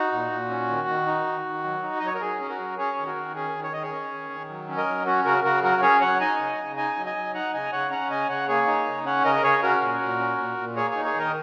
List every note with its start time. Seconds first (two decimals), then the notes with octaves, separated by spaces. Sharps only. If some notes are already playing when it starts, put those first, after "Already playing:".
Already playing: D#4 F#4
0.12 A#2
0.31 A#2
0.50 C#4
0.69 D#3
0.88 D#3
1.07 D#4
1.26 D#3
1.45 D#3
1.64 F#3
1.83 D#4
2.00 D#5
2.02 F#3 C#5
2.15 A#4
2.21 F#3 G#4
2.40 C#4
2.49 F#4 A#4
2.59 F#3
2.78 C#4 G#4 C#5
2.97 D#3
3.06 F#4 A#4
3.16 D#3
3.35 C#4 G#4
3.55 D#3
3.63 C#5
3.73 D#3 D#5
3.83 G#4 C#5
3.92 C#4
4.12 D#3
4.30 D#3
4.49 F#3
4.68 C#4
4.77 A#4 D#5
4.87 F#3
5.06 C#4 F#4
5.25 C#3 F#4 A#4
5.44 C#3 F#4 A#4
5.63 F#3 F#4 A#4
5.82 C#4 G#4 C#5
6.01 F#3 C#5 F#5
6.20 D#4 D#5 G#5
6.39 C#3
6.58 C#3
6.77 D#4 D#5 G#5
6.96 F#3
7.06 D#5 G#5
7.16 F#3
7.34 D#4 F#5 A#5
7.53 C#3 D#5 G#5
7.72 C#3 C#5 F#5
7.91 C#4 F#5 A#5
8.10 C#3 D#5 G#5
8.29 C#3 C#5 F#5
8.48 A#3 G#4 C#5
8.67 D#4
8.86 C#3
9.05 C#4 C#5 F#5
9.25 C#3 A#4 D#5
9.36 A#4
9.43 C#3 G#4 C#5
9.62 C#4 F#4 A#4
9.81 A#2
10.01 A#2
10.19 C#4
10.38 A#2
10.57 A#2
10.76 A#3 G#4 C#5
10.91 D#4 G#4 C#5
11.05 G#4 C#5
11.14 D#3 A#4 D#5